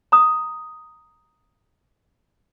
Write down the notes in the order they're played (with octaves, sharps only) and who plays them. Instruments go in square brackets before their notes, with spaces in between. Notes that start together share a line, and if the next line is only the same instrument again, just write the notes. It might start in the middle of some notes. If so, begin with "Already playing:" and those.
[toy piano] A#5 D#6